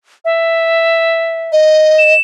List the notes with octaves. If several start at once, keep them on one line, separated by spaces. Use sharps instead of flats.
E5
D#5
E7